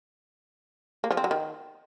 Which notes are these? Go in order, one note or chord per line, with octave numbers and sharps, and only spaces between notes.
A#3
F3
C4
F#3
D#3